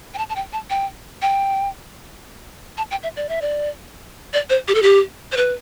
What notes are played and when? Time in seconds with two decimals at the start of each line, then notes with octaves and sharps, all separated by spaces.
0.14 G5
0.18 A5
0.30 A5
0.36 G5
0.53 A5
0.70 G5
1.22 G5
2.77 A5
2.91 G5
3.03 E5
3.17 D5
3.29 E5
3.42 D5
4.33 D5
4.50 C5
4.68 G4
4.75 A4
4.82 G4
5.32 C5
5.37 B4